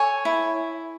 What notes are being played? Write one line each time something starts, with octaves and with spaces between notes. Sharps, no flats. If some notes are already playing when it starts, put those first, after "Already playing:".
Already playing: A4 C#5 G#5
E4